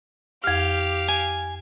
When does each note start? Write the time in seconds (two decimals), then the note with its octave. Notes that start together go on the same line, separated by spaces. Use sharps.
0.44 F2 G4 F5 F6
1.09 G#5